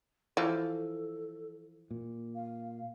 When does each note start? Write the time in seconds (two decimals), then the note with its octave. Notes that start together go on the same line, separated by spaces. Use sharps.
0.37 E3 F3 A4
1.91 A#2
2.35 F5